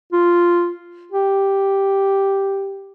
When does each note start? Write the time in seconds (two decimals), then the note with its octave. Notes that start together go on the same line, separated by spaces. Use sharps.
0.13 F4
1.12 G4